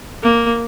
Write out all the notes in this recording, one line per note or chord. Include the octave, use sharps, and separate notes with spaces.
A#3